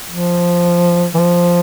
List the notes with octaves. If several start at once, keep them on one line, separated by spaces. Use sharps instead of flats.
F3
E3
F3